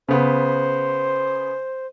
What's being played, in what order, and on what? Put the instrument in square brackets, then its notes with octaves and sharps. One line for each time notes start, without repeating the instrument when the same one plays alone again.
[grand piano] C#3 B3 [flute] C5